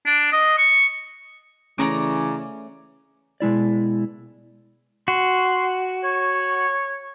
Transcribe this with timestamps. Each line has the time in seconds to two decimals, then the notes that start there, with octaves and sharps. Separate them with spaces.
0.06 D4
0.32 D#5
0.58 C#6
1.78 C#3 E3 A3 C#4 D5 A#5 D6
3.40 B2 G#3 E4 D5
5.08 F#4 C6
6.04 C#5